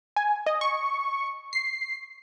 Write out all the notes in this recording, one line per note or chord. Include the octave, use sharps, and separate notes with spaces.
G#5
D#5
C#6
C7